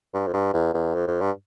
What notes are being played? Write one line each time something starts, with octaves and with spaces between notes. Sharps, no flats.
G2
F2
G2
E2
E2
F2
F2
G2